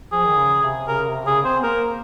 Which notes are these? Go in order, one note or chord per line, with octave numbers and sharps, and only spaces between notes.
F3 G#4
D#3
C#3
C3
C#3 A#4
C3
C#3 G#4
C4 C5
A#3 A#4